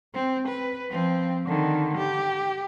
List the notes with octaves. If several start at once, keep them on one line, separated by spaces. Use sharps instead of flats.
C4
B4
F3 C4
D3 D#3
G4